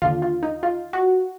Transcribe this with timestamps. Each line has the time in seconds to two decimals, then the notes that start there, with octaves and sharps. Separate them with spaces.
0.02 D#2 D3 F4
0.22 F4
0.43 D#4
0.63 F4
0.93 F#4